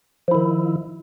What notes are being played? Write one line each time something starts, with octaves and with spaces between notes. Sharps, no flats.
D#3 F3 E4